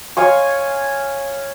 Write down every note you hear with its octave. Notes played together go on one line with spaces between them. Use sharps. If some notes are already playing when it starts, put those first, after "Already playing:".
C#5 F5 G#5 C#6